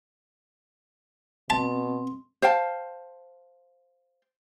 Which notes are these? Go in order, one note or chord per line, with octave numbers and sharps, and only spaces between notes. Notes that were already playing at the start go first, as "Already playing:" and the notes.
B2 C4 A5
C5 F5 G5 A5